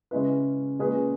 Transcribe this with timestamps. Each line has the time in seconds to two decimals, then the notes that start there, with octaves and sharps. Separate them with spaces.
0.11 C#3 G#3 C#4 E4 B4
0.79 A#2 G#3 C#4 G#4 B4